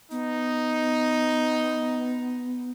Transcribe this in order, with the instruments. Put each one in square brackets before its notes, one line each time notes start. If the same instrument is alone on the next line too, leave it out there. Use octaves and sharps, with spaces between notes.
[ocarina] B3 [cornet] D#4